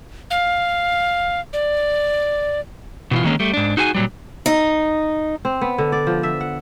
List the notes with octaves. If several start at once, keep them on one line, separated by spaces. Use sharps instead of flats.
F5
D5
B2 E3 F4
D3 D#3 G#3 A#3 C#4
G3 A3
G#2 D4
D#4 F#4 G#4 G#5
A#2 F#3 G3
D#4
C4
B3
D3
D5
F3
E5
F#5